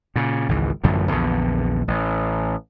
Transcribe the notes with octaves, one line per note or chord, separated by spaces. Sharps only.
A#2 C#3
G#1 C#2 E3
A1 F#2 D3 F3
A#1 E2 D3
A1